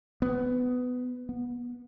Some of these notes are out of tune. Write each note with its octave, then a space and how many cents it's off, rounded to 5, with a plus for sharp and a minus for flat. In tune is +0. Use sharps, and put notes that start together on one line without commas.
B3 +15
B3 -25